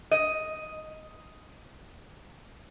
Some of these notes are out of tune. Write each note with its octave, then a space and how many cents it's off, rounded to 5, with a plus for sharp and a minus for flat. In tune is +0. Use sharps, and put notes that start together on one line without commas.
D#5 +5